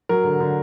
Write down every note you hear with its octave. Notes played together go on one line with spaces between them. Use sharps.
F#3 A#4
D3
D3